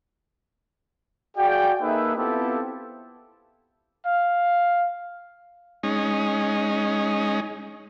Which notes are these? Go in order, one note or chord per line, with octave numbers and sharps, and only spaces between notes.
F#4 G#4 D5 F5 G5
A#3 D#4 G#4 A4 B4 E5
B3 C4 E4 F4 G4 A4
F5
G#3 C#4 D#4